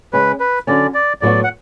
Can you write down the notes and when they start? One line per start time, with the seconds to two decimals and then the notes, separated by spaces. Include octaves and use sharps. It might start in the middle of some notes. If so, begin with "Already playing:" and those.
0.13 C#3 G#3 C#4 B4
0.40 B4
0.67 D3 F#3 C#4 D5
0.94 D5
1.21 A2 F#3 B3 F#4 D5
1.44 F#5